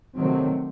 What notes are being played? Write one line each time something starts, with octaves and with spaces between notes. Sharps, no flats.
C3 D#3 F#3 A3 C4